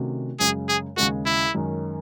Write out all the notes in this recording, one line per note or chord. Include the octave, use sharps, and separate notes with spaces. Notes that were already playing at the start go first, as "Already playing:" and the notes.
Already playing: C3 D#3 A3 C#4 F#4
F#2 C#3 G#3 C#4 G#4
G#4
D#2 C#3 G#3 F#4
E4
F#2 D#3 G#3 C#4